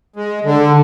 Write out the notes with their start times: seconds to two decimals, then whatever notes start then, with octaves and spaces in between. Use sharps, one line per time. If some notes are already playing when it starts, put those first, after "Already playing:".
0.16 G#3
0.44 D3